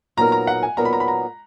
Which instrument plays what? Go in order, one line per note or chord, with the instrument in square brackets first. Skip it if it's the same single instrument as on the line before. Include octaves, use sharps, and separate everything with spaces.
[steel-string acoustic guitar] A#2 F#3 B3 D#4 A#4 [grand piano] A#5
[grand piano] A#5
F#5
G#5
[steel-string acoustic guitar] A#2 F#3 B3 D#4 A#4 [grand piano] A#5
[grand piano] B5
A#5
B5
A#5